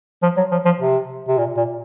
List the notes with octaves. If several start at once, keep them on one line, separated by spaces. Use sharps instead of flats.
F3
F#3
F3
F3
C3
C3
A#2
A#2